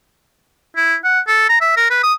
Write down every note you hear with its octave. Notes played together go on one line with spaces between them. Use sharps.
E4
F#5
A4
A#5
E5
A#4
B4
D#6